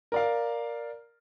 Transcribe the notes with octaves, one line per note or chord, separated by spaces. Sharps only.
A#4 D5 F5